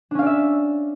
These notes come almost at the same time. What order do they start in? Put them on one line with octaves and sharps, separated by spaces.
D4 C#4 F5 D5 E5